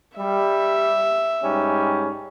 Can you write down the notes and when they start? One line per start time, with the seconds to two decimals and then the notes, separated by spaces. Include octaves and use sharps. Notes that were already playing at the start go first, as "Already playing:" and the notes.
0.17 G3 E5
1.43 G#2 G3 C#4